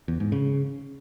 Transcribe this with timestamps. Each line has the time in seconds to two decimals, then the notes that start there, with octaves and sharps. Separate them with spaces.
0.08 E2
0.20 G#2
0.32 C#3